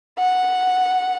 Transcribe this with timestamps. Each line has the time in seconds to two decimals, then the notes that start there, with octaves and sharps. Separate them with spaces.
0.19 F#5